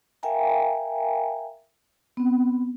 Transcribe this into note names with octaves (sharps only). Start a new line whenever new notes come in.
A#4 E5 F5 G5 G#5 A#5
B3 C4